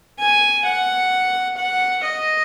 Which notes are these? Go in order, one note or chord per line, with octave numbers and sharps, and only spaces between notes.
G#5
F#5
F#5
D#5